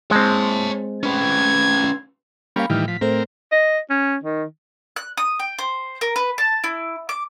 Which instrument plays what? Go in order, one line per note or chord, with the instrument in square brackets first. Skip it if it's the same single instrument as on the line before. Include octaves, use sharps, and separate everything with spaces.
[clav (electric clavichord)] G#3 C4 [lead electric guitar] C#5 A5
[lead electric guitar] C#4 B4 [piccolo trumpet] G#6
[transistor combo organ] G3 A#3 C#4 [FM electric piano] F5 B5
[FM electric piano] A2 F6 [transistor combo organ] D#3 E3 G3
[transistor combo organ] F3 [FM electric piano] B6
[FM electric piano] A2 A3 C5 [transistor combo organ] C4 A#4
[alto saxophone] D#5
C#4
D#3
[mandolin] F#6
D#6
G5
C5
A#4
B4
A5
E4
D6